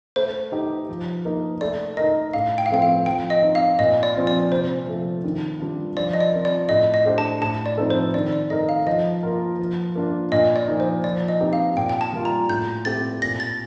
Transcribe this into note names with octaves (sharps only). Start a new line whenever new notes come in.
A3 C5
D#4 G4
F3
A#3 D#4
A3 D5
D#4 A#4 D#5
A2 F5
G5
F5
F3 A3 C4 G5
F5
F3 G5
D#5
C4 D#4
F5
A#2 D#5
D5
F3 C4 F4
D5
C3 C5
F3 A3
D#3
G3 D4 F4
F3 D5
D#5
D5
C4 F4 A#4
D5
A2 D#5
D#5
A3 D4 G4 C5
A5
A2 A5
D5
F3 C4 D#4 A4
C5
D#3 D5
D5
A3 D#4 A#4 D#5
F5
F3 D#5
A#3 F4 A#4
F3
A#3 D4 F4
A#2 D#5
D5
F3 A#3 D#4
C5
F3 D5
D#5
C4 D#4 G4
F5
A#2 G5
G5
A5
G3 A#3 F4
A#5
A2 G6
A3 C4 G4 A6
A#2 A#6
A6